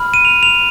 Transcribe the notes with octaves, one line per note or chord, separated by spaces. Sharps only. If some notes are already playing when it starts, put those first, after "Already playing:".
Already playing: B5 F6
D#7
F7
F7